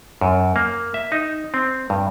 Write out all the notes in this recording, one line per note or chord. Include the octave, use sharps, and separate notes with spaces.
F#2
A#3
E5
D#4
C4
G2